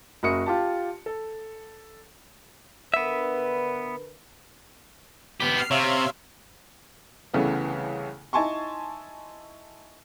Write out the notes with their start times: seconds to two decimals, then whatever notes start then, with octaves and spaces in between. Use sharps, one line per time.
0.23 F#1 F#4 A#4 E5 D#6 C#7
0.46 F4 G4 A5
1.06 A4
2.94 D3 B3 A#4 B4 E5
5.40 B3 G4 B6
5.57 F6 C7
5.71 C3 C#5 E5 F5
7.34 C2 C#3 E3 A3 B3
8.33 D#4 E4 G#5 A5 C6 C#6